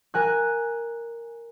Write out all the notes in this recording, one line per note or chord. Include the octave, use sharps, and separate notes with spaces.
A#4 G#5 F#6